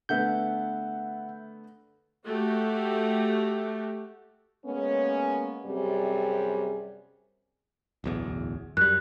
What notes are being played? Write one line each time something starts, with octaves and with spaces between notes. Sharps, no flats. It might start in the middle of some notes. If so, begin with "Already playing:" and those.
D3 A3 B3 E5 F#5 G6
A3 F#4 G4
G#3 A#3 B3 C#4
F#2 C3 G3 C4 G#4
D1 B1 E2
F#2 G3 F#6